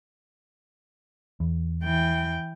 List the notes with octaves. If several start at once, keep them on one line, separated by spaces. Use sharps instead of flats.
E2
E3 G5